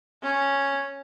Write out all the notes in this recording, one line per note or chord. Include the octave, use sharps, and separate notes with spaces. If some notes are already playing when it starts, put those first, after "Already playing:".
C#4